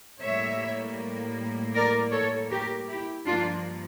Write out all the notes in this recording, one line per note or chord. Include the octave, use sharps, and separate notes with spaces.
A2 G3 A#3 C#5 E5
A#4 D5
A4 C#5
G4 A#4
E4 G4
G2 F3 A#3 D4 F4